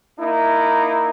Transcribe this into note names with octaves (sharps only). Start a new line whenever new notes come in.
A#3 D#4 E4